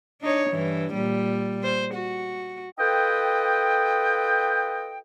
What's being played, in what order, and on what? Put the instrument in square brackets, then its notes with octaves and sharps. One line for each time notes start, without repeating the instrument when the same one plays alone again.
[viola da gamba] D4 D#4 C#5
G2 E3
A#2 G3
C5
F#4
[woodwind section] F4 A4 B4 D#5 G5